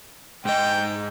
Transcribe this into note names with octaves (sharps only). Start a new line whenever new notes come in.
G#2 D#5 G5